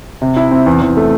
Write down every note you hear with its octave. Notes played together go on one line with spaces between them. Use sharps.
C3
E4
C4
E2
E2
A3